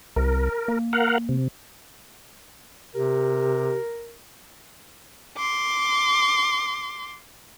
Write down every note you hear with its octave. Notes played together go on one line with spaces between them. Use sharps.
C2 A#4
A#3
A#4 F5 F#5
C3
C3 G4 A#4
C6 D6